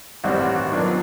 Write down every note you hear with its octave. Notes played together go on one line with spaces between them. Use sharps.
A1 G2 D#3 G3 C4 F#4
F#4
F#4
F#2 D#3 F#3 B3 D4 F4